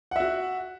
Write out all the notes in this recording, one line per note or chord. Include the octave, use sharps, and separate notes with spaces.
F#4 E5 F#5